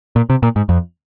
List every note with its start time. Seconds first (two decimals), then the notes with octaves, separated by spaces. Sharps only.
0.16 A#2
0.30 C3
0.43 A#2
0.56 G#2
0.69 F2